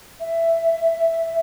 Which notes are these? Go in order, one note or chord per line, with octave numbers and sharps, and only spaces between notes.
E5